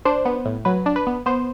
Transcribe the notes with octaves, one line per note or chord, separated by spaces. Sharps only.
D4 C5
B3
A2
F#3 B4
D4
B4
B3
B3 C5